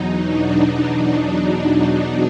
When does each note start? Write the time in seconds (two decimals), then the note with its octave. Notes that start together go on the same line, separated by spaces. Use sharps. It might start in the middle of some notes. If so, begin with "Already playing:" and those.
Already playing: E2 B2 F#3 D#4
0.22 D4
0.61 D4
1.00 D#4
1.39 D4